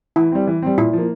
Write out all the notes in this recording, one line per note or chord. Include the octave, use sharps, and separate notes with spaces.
E3 E4
G3 C4
E3
G3 C4
A#2 E4
F3 A#3